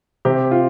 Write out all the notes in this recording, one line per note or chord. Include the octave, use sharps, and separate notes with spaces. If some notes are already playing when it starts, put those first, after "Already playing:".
C3 G4
F4